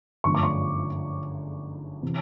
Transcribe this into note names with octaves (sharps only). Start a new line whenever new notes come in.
G1 F#2 D3 F3 A3 C#6
D6
C#6
C3 E3